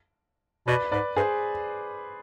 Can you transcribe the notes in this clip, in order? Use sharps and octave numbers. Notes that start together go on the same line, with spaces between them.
B2 B4 D5
G#2 B4 D5
G2 G#4 C5